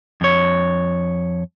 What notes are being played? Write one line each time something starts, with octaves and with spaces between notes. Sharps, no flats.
F2 C#5